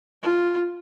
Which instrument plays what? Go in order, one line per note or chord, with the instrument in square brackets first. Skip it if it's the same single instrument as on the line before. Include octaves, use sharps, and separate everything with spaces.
[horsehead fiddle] F4